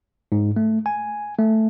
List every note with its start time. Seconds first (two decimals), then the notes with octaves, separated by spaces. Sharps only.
0.32 G#2
0.56 A3
0.86 G#5
1.39 A3